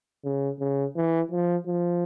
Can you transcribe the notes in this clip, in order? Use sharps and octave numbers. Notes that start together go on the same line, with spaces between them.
C#3
C#3
E3
F3
F3